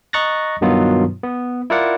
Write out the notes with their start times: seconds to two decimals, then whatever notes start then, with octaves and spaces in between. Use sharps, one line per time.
0.13 D#5 A#5 C#6 F#6 A6 A#6
0.61 G2 B2 D#3 F#3 B3 F4
1.23 B3
1.70 E4 F4 A#4 D5 F#5